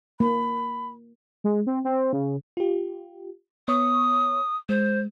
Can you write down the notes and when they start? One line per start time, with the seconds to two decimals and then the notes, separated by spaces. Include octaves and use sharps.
0.20 A#3 B5
1.44 G#3
1.67 C4
1.85 C4
2.13 C#3
2.57 F4 G4
3.68 B3 C#5 C#6 D#6
4.69 G#3 C5